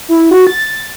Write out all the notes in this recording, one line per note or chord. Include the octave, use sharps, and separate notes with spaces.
E4
F#4
A6